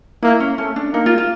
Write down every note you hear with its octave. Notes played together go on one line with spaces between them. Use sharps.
A#3 E4
C#4
A3 C#4
D4
A#3 D#4
F4
F4